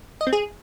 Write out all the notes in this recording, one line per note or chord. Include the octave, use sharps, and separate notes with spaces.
D#5
C4
G#4